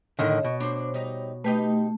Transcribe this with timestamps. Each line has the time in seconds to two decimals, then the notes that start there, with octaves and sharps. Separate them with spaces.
0.19 A2 D3 D#3 C#5 D#5
0.45 B2
0.60 D4 C5
0.94 G3 D#4
1.44 A3 D#4 G4 B4